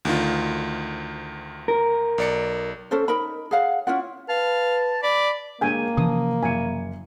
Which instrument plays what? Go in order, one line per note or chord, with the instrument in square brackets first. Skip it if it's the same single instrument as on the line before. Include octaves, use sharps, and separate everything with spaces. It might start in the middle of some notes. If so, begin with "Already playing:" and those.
[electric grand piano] D2 D#3 F4
[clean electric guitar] A#4
[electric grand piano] B1 D5 C#7
[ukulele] C#4 A4 C5
D#4 A#4 B5
G#4 C#5 F5 F#5
C#4 E4 F4 F#5
[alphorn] B4 [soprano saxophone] F5 [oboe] A5
[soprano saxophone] D5 [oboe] B5
[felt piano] D3 G#3 [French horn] A#3 [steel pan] G5 G#5
[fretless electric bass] C3 E3 F3 [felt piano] C#4 A5 [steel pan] D#6
[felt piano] F#1 C#7 [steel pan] G#5